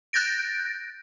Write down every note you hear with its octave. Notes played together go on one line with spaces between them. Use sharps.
F#6 G6 A6 A#6 D7